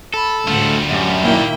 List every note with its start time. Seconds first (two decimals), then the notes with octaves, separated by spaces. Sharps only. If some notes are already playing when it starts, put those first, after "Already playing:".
0.14 A4 B5
0.48 D2 A2 G3 G#3 F4 F#5
0.90 F#2 G4
1.23 A#2 D#3 A#3 E4 G5